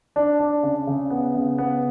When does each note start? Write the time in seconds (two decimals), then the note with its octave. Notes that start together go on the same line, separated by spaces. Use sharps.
0.16 D4
0.40 D4
0.63 C#3
0.87 C#3
1.10 B3
1.35 C#3
1.58 B3